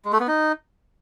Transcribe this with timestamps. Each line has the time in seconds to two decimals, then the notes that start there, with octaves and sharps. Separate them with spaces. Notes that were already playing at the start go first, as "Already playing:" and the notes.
0.05 G#3
0.13 A3
0.20 B3
0.28 D#4